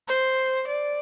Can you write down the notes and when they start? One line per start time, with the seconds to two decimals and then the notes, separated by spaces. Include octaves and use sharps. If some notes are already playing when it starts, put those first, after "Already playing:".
0.08 C5
0.68 D5